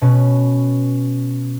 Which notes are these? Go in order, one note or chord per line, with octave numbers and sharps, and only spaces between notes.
B2 C#4 B4